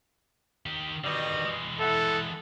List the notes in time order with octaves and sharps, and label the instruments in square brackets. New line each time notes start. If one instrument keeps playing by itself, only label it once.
[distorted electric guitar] D#3 G4
[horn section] B2 G3 D#5 [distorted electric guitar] D3 D#3
[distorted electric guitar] E3 G#3
[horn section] E4 E5 F#5 [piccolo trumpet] A4